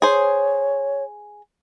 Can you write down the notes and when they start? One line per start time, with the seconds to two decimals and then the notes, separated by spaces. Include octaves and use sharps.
0.02 G#4 C5 C#5